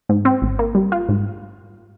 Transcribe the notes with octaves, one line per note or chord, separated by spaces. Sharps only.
G#2
C4
G#1
A#3
G3
F4
G#2